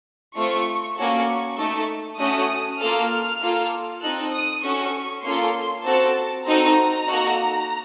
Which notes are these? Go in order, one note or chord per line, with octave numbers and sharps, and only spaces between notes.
A3 C4 F4 C#6
A#3 C#4 F#4 A4 C#6
A3 D#4 A4
A3 C#4 F#4 D#6
A#3 F4 A4 F6
A#3 F4 A4
C4 D#4 A4 F#6
D#6
C#4 F#4 A4 C#6
A#3 C#4 F4 A4 C6
C4 F#4 A4 A5
C4 D#4 F#4 A4 A#5
A#3 D#4 F#4 A4